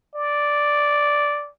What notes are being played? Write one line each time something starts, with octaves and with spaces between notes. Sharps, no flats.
D5